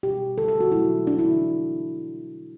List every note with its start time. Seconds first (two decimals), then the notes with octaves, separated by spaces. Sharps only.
0.03 B2 G3 G4
0.37 D3 G3 A4
0.48 A4
0.60 F#4
0.72 B2 F#3 A3 E4
1.06 D3 A3 D4
1.19 E4